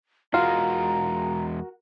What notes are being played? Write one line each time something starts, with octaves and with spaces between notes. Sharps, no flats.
E2 G#3 F4 F#4 A#4 A#5